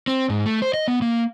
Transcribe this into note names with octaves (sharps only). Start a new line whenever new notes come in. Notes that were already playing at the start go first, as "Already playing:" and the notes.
C4
G#2
A3
C5
D#5
B3
A#3